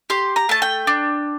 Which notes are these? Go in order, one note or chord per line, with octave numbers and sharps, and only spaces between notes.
G4 C6
A#5
A3 A5
G5
D4